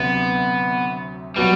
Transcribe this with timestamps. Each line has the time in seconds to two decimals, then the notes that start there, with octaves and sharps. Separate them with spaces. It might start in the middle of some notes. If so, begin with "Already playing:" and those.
Already playing: D2 C3 F#3 B3
1.36 B2 F#3 G3 B3 F#4 B4